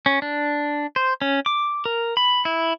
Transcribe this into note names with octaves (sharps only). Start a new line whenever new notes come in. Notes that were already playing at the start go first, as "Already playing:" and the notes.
C#4
D4
C5
C#4
D6
A#4
B5
E4